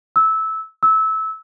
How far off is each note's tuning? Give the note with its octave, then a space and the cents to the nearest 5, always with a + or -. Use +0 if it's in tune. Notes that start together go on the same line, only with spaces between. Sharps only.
E6 -15
E6 -20